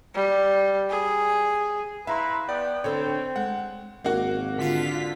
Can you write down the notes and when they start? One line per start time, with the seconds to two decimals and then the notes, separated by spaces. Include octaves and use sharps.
0.15 G3
0.90 G#4
2.07 E4 B4 E5 F5 A#5 C6
2.49 B3 D5 G5
2.84 D3 C4 D4 A4 C#5
3.36 G#3 F#5
4.04 G#1 A#3 F#4
4.58 D3 F4 B6